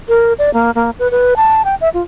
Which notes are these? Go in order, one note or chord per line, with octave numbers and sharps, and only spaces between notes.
A#4
D5
A#3
A#3
B4
B4
A5
G5
E5
F4